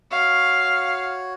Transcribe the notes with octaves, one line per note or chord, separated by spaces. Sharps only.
F#4 C#5 F5